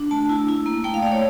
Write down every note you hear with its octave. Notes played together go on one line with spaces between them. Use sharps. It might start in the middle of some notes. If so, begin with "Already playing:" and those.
Already playing: D4
A3 A5
E4
E4
A#3
A3 G5
F5
A3 D5
C#5